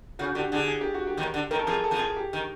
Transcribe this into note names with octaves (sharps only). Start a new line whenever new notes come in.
C#3 F#4
D3 G4
D3 G#4
G#4
G4
F#4
G4
D#2 D#3
D3
D#2 D#3 A#4
A4
F2 F3 G#4
A4
F2 F3
G#4
G4
D#3